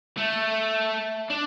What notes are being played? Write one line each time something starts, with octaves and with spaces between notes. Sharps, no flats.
A3
D4